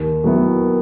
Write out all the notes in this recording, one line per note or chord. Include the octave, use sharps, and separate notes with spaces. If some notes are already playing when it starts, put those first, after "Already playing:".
Already playing: D#2
D#3 F#3 B3 E4